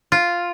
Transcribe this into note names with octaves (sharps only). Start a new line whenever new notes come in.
F4